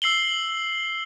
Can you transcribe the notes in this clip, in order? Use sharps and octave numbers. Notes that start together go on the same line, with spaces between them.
E6 C7 F#7 G7